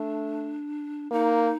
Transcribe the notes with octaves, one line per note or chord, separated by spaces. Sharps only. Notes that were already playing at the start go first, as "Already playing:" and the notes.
Already playing: A3 D4
A#3 D#4